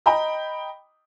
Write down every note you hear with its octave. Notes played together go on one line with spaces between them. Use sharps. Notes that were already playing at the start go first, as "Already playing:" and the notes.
D#5 G5 A#5 B5